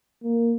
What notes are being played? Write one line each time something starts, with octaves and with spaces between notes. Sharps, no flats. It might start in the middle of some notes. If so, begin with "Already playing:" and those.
A#3